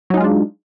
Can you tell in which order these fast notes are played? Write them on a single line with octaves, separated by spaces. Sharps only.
F#3 D#4 G#3 F4 D4